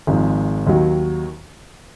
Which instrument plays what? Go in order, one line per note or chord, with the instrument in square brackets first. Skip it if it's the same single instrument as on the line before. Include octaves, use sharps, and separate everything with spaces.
[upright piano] G#1 G#2 F3 G#3
D#2 D#3 F#3